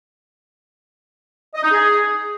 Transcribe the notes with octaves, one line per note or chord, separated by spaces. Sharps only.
D#5
D#4
G#4